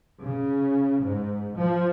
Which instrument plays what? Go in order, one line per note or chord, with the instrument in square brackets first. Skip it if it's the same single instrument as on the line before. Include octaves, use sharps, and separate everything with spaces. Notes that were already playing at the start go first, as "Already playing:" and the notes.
[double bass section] C#3
G#2
F3